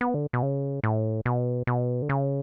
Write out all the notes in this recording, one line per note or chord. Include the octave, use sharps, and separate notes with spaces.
B3
D3
B2
C#3
A2
B2
B2
D3
C#3